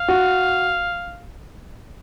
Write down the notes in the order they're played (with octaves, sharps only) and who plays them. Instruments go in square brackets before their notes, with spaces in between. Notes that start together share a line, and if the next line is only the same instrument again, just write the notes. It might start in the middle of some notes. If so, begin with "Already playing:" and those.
Already playing: [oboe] F5
[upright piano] F#4